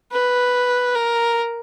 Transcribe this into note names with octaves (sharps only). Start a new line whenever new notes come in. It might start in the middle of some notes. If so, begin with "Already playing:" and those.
B4
A#4